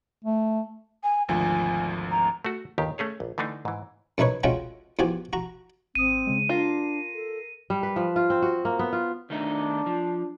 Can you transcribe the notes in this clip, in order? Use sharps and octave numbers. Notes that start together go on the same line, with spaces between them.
A3
G#5
G#1 D2 F3 G#5
A#5
A3 F#4
G1 D#2 D#3 G4
A3 C#4 G#4 C#5
A#1
D3 E3 A3 D4 D#4
G#2 E3
F#2 A3 D#4 B4 C#5
G#3 A3 C#4 F4 F#4 G5
E2 F3 F#4 G4 G#5
F#4 A#5
G#1 C4 D#6 D#7
C#3 G#3
D4 F4 A#4 A#6 C7 D#7
A4
G3
B4
F3
F4
C4
F#4
A#3
B3
F4
D#3 A3 D4 D#4
F3